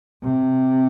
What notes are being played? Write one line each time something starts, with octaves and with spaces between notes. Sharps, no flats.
C3